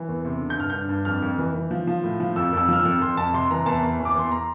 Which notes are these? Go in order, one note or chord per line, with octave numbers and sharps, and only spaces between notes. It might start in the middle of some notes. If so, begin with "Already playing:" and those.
Already playing: E3
E2
C3
D3
G6
G2 F6
G2 G6
G2
F2 F6
F2
E3
E3
F3
F3
A2
F3
F2 E6
F2 E6
F3 F6
E6
F2
F2 C6
F2 A5
C3 C6
E3 A#5
E2 A5
E2
E2
D6
E2 C6
A#5